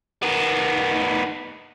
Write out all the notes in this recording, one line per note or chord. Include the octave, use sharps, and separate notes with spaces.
D#3 B3